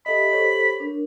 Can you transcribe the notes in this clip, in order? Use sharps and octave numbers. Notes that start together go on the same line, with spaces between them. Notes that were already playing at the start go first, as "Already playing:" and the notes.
G4 A4 D#5 E5 B5
G4 A4 C5 C#5
D4 A#4